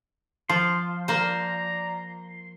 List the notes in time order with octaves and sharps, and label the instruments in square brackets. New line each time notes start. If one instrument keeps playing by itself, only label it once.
[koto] F3 [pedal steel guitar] C6
[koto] A#3 C5 [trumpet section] D5 A#5